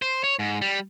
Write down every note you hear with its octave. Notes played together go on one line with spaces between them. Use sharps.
C5
C#5
G#2
G3